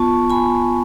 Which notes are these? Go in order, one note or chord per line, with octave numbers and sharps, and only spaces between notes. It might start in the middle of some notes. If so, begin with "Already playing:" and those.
Already playing: B3 F4 A5 C#6
G#5 B5